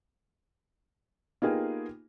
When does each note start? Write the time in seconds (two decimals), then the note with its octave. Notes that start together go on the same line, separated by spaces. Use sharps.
1.42 A#3 B3 D#4 F4 G4 G#4